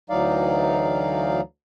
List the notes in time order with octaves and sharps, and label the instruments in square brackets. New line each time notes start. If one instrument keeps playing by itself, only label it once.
[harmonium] D2 E3 F#3 D#4 D5 F5